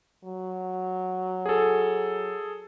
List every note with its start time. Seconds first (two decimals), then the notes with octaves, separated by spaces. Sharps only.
0.24 F#3
1.46 G#4 A4